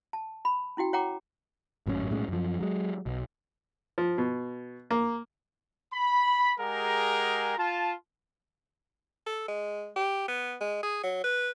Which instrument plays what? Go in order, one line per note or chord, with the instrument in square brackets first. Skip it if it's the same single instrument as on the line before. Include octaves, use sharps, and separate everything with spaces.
[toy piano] A5
B5
C#4 E4 F#4 G5
C#5 F#5 G5 A#5 D6
[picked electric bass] G#1 F#2 A2 C#4
B1 A2 G#3 C#4
F#2 F3
F#3 G#3
B1
[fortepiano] F3
B2
A#3
[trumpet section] B5
G#3 G4 G#4 A#4 F#5 A#5
F4 A5
[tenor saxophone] A4
G#3
G4
B3
G#3
G#4
F#3
B4